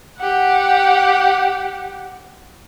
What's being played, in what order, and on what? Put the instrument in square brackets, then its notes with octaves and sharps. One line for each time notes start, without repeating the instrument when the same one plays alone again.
[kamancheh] G4 F#5